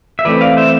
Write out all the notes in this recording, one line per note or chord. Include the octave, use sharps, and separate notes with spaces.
E5
E3 A3 C4 B4 D5
D5 F5
C5 E5